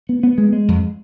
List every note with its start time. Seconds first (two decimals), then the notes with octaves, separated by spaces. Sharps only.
0.09 B3
0.23 B3
0.38 G#3
0.53 G#3
0.68 F2